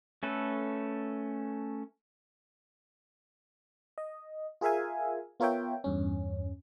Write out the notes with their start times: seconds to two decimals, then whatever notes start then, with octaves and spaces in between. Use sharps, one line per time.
0.23 A3 C#4 A4 B4
3.98 D#5
4.61 F4 G#4 A#4 E5 F5 G#5
5.40 B3 F4 A#4 C#5 E5 G5
5.84 E2 G2 C#4